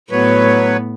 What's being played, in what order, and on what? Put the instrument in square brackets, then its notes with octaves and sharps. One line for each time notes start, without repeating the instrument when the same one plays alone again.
[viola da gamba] A2 B3 [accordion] F#3 B4 C#5